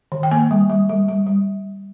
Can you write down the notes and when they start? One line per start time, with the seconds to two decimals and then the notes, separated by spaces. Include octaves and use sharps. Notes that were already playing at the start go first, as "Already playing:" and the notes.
0.12 D#3
0.23 G5
0.31 A#3 G#5
0.51 G3
0.70 G3
0.89 G3
1.08 G3
1.27 G3